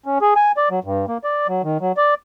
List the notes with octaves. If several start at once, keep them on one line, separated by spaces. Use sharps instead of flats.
C#4
G#4
G#5
D5
F#3
G2
A#3
D5
F#3
D#3
F#3
D5